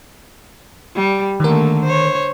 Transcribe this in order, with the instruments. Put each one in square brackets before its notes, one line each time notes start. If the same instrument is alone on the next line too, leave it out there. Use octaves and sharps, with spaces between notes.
[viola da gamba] G3
[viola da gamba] D3 A3 A#3 [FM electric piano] D#3 A#4
[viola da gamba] C5 C#5